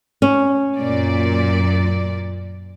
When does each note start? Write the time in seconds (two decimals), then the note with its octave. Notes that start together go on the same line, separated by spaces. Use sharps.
0.22 C#4
0.78 F#2 A#2 D5